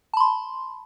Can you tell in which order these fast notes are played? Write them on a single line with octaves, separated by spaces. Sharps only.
A5 B5 C6